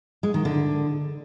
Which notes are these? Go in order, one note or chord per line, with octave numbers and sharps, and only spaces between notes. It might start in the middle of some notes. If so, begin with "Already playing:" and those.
G#3
D#3
D3